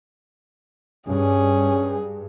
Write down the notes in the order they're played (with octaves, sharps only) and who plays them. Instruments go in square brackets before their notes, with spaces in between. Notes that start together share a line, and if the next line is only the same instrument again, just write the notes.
[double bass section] G2 [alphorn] C#4 [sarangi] G#4